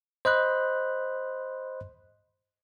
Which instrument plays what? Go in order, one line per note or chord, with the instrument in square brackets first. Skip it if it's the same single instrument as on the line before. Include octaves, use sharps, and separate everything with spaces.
[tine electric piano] C5 D#5 B5 F#6